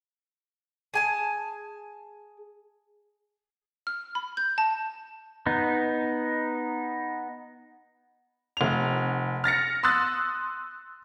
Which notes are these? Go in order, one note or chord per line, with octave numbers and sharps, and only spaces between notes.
G#4 G#5 A5
F6
B5
G6
A5
B3 D#4
F1 F7
F6 A6 A#6 C#7
C6 D#6 E6 F#6 A6